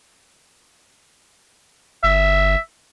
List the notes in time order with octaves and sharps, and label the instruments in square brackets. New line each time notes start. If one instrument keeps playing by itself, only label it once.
[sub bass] G1 [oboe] E5